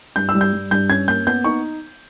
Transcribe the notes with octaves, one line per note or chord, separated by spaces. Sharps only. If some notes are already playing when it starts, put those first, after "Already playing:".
G2 G6
E6
G3
G6
G3
G2 G6
C#4 G#6
A#3 G6
B3 G6
D#4 C#6